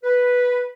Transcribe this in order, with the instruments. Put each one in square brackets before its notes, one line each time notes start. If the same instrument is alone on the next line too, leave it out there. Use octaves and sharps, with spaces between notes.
[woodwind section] B4